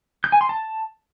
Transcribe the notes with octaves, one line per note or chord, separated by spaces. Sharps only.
G6
G#5
C6
A5